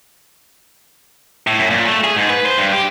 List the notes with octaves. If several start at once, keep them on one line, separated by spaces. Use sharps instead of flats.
A2
F#2
A#2
A3
G#4
G#2
B4
C5
G2
G4